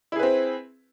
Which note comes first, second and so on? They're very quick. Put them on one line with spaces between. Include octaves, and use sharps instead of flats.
E4 G#4 B4 C4